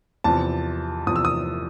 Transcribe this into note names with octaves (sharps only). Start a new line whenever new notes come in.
E2 C3 F3 A5
E2 C3 F3 D#6
E6
D#6